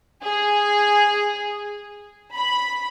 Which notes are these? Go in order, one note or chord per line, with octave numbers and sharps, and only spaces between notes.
G#4
B5